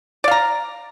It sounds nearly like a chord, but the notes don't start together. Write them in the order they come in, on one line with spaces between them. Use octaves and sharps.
D5 F5 A#5